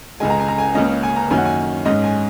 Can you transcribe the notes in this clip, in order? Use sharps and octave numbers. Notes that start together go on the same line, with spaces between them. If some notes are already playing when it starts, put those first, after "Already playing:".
C#2 C#3 G#3 G#5
A#5
G#5
A#5
G#5
C#2 C#3 A#3 C#4 D#5
G#5
A#5
F#2 D#3 A#3 C#4 G#5
F#5
G#5
G#2 G#3 C#4 D#5
G#5